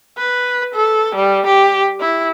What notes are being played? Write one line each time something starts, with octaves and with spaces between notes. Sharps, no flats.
B4
A4
G3
G4
E4